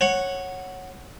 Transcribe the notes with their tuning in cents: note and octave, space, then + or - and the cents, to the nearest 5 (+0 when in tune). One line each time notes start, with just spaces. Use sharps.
C#5 -10 F#5 +0